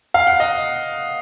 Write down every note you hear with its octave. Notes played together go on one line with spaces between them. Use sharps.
F5
F#5
D#5